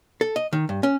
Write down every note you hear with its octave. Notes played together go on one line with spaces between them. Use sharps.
A4
D#5
D#3
G2
C#4